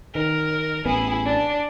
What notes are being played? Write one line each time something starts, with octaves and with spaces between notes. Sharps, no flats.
D#3 A#4
A1 B3 E4 G#4
D4